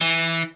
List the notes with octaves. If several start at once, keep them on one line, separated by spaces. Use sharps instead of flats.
E3